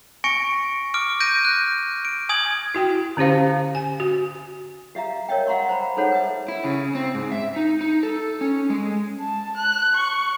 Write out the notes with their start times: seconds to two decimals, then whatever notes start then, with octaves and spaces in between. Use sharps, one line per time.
0.24 G#5 C#6 A#6 C#7 D7
0.94 D6 F6 D7
1.20 G6 A#6 D7 D#7
1.45 F#6
2.05 D7
2.29 G#5 D#6 G#6 F#7
2.74 E4 F#4 G5
3.17 D3 C#4 G4 C5 F5
3.75 G#5
4.00 F#4
4.95 G4 E5 F5 A#5
5.29 A#4 C#5 D#5 E5 G5
5.47 F5 F#5 A#5 C6 C#6
5.69 C5 A#5 B5
5.97 D#4 G#4 A4 C5 C#5 F#5
6.12 B4 E5
6.48 E4
6.64 C#3
6.95 C4
7.15 G#2
7.32 E5
7.56 D#4
7.81 D#4
8.03 A4
8.41 C#4
8.70 G#3
9.20 A5
9.57 F#6
9.95 C#6